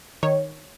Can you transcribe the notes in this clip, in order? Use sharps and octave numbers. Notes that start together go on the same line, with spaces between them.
D#3 C#5